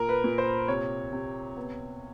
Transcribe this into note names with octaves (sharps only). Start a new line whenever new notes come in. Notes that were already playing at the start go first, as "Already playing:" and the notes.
Already playing: A#2 A#4
B4
A#2
C5
C3 C#5
C3
B3